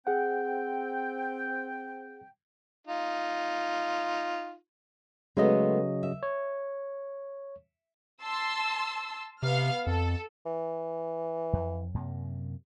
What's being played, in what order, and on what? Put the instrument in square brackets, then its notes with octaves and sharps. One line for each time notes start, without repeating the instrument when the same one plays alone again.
[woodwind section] C4 G5 [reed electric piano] G#4 F#5
[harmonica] D#4 F4
[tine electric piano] C#3 F#3 D#5 [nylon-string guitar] G#3 A3 B3
[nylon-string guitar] E5
[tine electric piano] C#5
[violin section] A5 C6 E6
[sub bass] C3 [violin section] B3 F5 F6
[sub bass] F2 [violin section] A4
[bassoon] E3
[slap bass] F2
F#2 C3 A#3